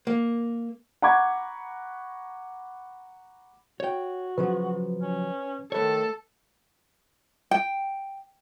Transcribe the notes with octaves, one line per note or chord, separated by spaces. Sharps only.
A#3
F#5 A#5 B5 C#6 D6 G#6
F#4 C#5 G5
C#3 F3 F#3 B4
C#4
D#3 A3 A4 B4 C#5
G5